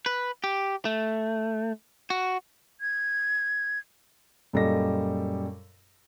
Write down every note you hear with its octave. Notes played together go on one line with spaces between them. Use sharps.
B4
G4
A3
F#4
G#6
F#2 A#2 G3 A4 D#5 A#6